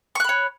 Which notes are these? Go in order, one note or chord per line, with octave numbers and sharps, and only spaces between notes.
C#5 B5 C#6 F#6